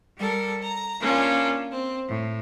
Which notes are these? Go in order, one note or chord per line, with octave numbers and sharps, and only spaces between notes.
G3 A4 A#4
A#5
A#3 C#4 D4 F4
C4
A2